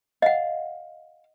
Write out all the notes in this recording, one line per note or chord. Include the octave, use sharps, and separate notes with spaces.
D#5 F5 F#5